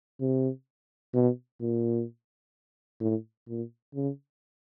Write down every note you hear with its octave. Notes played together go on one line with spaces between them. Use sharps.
C3
B2
A#2
A2
A#2
C#3